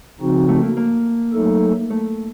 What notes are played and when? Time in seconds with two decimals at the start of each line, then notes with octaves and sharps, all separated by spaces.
0.20 C#3 F3 C4 D#4 F#4
0.48 A3
0.63 A#3
0.77 A#3
1.33 F#3 A3 D#4 A4
1.90 A3